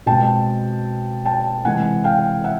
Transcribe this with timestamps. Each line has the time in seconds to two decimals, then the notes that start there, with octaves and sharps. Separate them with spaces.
0.06 B2 G#3 C4 G5 A5
1.25 G5 A5
1.65 C3 E3 G#3 F#5 G#5
2.04 F5 G5
2.44 E5 F#5